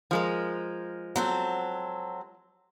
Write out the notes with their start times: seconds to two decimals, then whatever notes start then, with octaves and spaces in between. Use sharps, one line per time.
0.11 F3 G#3 A#4
1.16 F#3 C4 A4